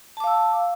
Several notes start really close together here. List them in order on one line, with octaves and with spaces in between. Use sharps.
A5 D6 F5 E6